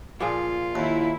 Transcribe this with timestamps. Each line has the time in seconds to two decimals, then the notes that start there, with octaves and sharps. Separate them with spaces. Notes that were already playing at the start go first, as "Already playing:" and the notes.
0.20 A#2 F3 F4 G#4
0.75 D#2 E4